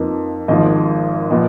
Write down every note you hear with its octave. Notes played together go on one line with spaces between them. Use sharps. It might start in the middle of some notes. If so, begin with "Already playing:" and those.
Already playing: F2 F3 A#3 D#4 B4
G#1 G#2 F3 A#3 D#5
A#2 F3 B3 D#5